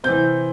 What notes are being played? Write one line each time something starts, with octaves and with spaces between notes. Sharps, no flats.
C3 E3 G6